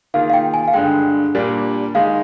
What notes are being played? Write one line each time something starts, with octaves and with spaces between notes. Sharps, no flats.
D#3 A#3 F4 G#4 F5
F5
G5
G#5
F5
G2 D3 G#3 G5
A#2 G3 A#3 D4
D#3 G#3 D#4 F5